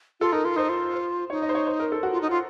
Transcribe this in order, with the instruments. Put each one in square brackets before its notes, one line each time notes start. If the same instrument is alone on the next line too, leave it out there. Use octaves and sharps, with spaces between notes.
[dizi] F4 [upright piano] A4
[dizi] D#4 [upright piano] A#4
[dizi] F4 [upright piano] A#4
[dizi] D#4 [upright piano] C5
[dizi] F4
[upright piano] C5
[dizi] D#4 [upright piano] C#5
[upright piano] D#5
C5
C#5
C5
A#4
A4
F#4
[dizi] F4
D#4
F4